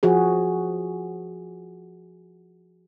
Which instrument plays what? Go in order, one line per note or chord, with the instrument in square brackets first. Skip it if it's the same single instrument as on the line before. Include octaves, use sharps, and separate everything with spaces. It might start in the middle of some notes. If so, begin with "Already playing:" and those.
[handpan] F3 F#4 G#4